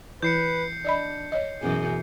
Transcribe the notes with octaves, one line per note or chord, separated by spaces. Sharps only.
E3 E4 B4 G6 C7 C#7
D4 D5 D#5 B5
C#5 D#5
F#2 B2 E3 G#4